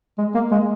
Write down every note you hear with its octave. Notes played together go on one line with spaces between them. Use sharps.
G#3
A#3
G#3